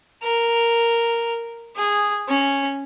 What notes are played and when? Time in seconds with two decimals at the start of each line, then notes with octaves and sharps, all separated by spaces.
0.23 A#4
1.76 G#4
2.28 C#4